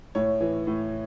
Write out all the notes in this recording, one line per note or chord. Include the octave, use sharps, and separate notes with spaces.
A2 C#5
E3
A2